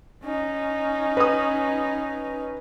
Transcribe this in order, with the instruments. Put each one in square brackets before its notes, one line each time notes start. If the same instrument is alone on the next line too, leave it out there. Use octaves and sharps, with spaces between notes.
[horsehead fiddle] C#4 D#4
[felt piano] B4 D#6